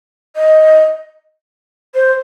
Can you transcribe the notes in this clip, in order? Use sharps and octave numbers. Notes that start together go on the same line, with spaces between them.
D#5
C5